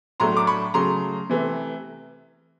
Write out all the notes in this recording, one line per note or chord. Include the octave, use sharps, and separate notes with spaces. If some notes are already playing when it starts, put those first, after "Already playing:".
A2 F#3 A3 D4 A#5 C6
D6
B5 C#6
C#3 F#3 A3 A#5 C6
C3 E3 A3